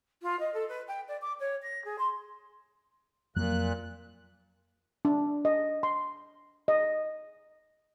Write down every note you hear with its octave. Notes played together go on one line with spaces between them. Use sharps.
F4
D#5
A4
B4
G5
D5
D6
C#5
A#6
G#4
C6
F2 A#2 F#3 A#3 F#6
D4
D#5
C6
D#5